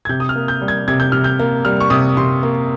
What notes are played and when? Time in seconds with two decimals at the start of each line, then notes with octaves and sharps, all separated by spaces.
0.05 G#6
0.09 C3 G6
0.20 D#6
0.29 F6
0.36 A#3
0.48 G6
0.61 G3
0.68 G#6
0.88 C3 G#6
1.00 G6
1.12 C3 F6
1.24 G6
1.39 A#3
1.65 G3 F6
1.80 C#6
1.90 C3 D#6
2.17 C3 C6
2.43 A#3